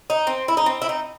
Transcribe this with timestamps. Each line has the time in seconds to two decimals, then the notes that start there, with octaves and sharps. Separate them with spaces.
0.10 D#4
0.27 C4
0.48 E4
0.57 D#4
0.66 C4
0.82 E4
0.89 D#4